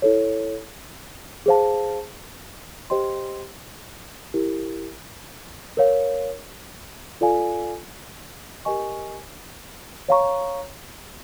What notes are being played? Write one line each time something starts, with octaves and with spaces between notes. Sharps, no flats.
E4 A4 C#5
G#4 C5 F5 A5
G4 C5 D#5 G5 C6
E4 G4 A#4
A#4 C#5 F5
F4 A4 D5 F5 G#5
G4 A#4 D#5 G#5 C#6
C#5 F5 A#5 C#6